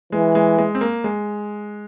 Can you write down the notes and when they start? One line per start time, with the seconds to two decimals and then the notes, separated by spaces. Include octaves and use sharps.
0.12 E3 G#3
0.35 G#3
0.58 G#3
0.75 C4
0.81 A#3
1.04 G#3